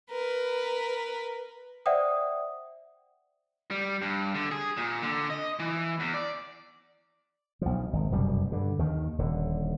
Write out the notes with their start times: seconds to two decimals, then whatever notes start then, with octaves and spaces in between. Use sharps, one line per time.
0.10 A#4 B4
1.86 C5 D5 E5 F#5 G5 D#6
3.71 G3
4.02 G2
4.35 D3
4.51 G#4
4.77 A#2
5.02 D3
5.30 D#5
5.59 E3
6.00 E2
6.14 D5
7.61 B1 F3
7.93 G#1
8.11 F1 F#2 B2 G3
8.52 G2 D3
8.79 D#2 D#3
9.18 D#1 D3